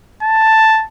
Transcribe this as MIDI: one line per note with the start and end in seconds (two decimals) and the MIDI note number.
0.23 0.84 81